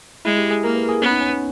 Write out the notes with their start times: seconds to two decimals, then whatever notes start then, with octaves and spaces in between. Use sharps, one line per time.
0.25 G#3 E4
0.38 G4
0.51 G#4
0.63 A#3 A#4
0.75 B4
0.89 G#4
1.01 B3 C#4
1.11 D#4
1.21 C#4
1.29 B3